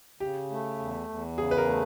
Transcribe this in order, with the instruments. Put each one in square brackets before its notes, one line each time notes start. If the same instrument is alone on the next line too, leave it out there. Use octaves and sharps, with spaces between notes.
[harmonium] C#3 [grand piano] G4
[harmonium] A3
E2
E2
[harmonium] C#3 [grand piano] G#4
[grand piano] B4
A#4
[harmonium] A3